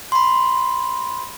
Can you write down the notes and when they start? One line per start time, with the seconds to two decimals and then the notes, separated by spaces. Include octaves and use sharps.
0.12 B5 C6